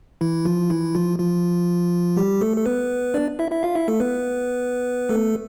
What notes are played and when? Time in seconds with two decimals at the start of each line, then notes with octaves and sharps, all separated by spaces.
0.21 E3 E4
0.45 F3 F4
0.70 E3 E4
0.95 F3 F4
1.19 F3 F4
2.16 G3 G4
2.41 A3 A4
2.57 A4
2.66 B3 B4
3.14 D4 D5
3.39 E4 E5
3.51 E4 E5
3.63 F4 F5
3.75 E4 E5
3.88 A3 A4
4.00 B3 B4
5.09 A3 A4